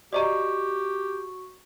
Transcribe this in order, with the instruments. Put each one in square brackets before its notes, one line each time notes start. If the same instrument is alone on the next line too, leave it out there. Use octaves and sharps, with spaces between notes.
[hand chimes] F#4 C#6 [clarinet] G4 [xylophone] D5 D#5 A#5